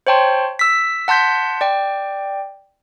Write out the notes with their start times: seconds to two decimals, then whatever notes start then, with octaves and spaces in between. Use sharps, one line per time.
0.07 C5 C#5 G5 A5 C6
0.59 E6 B6
1.08 F#5 A5 C6 G6 B6
1.61 D5 G5